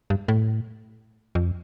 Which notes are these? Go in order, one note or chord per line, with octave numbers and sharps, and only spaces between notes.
G2
A2
F2